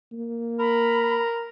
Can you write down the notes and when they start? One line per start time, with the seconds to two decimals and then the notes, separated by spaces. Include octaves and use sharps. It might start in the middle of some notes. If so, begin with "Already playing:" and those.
0.12 A#3
0.59 A#4 B5